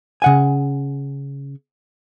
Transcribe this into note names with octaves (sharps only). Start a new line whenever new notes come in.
C#3 F#5 G#5